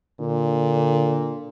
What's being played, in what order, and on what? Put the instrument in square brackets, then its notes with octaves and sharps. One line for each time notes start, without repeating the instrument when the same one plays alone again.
[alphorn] A#2 [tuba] D3